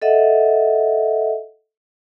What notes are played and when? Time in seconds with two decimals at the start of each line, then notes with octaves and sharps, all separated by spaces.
0.02 A4 D#5 E5 F#5